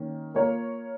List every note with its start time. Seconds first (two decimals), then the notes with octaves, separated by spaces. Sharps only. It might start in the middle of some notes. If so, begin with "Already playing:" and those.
Already playing: D#3 A#3 C#4
0.34 A#3 F4 A#4 C#5